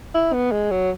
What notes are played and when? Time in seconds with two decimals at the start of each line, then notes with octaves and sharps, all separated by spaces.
0.14 E4
0.33 B3
0.52 G#3
0.71 F#3